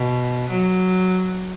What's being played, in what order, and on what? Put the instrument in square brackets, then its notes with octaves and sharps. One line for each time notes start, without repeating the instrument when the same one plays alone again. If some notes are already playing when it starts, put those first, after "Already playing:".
Already playing: [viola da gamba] B2
F#3